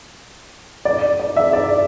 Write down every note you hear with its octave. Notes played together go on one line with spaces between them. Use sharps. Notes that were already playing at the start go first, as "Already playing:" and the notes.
D5
D5
E5
D5